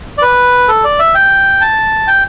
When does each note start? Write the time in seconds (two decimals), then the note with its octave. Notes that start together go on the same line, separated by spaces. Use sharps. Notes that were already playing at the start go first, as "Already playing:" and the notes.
0.18 D5
0.22 B4
0.68 A4
0.84 D5
0.99 E5
1.15 G5
1.61 A5
2.07 G5